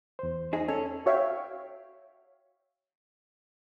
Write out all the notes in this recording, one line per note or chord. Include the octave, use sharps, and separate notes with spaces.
E2 C5
D#4 G#4
C#4 A4
F#4 C#5 E5 F5 G5